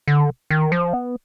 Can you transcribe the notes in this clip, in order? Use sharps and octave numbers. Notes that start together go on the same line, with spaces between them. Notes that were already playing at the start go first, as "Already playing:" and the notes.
D3
D#3
F3
B3